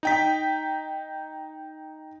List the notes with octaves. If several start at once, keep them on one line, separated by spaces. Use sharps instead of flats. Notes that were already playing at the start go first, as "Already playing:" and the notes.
D#4 G5 B6